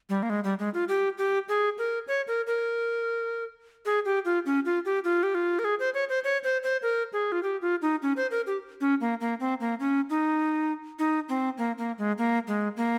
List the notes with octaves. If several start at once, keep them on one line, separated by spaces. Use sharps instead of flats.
G3
A#3
G#3
G3
G#3
F4
G4
G4
G#4
A#4
C#5
A#4
A#4
G#4
G4
F4
C#4
F4
G4
F4
G4
F4
A#4
G#4
C5
C#5
C5
C#5
C5
C5
A#4
G#4
F4
G4
F4
D#4
C#4
C5
A#4
G4
C#4
A#3
A#3
C4
A#3
C#4
D#4
D#4
C4
A#3
A#3
G#3
A#3
G#3
A#3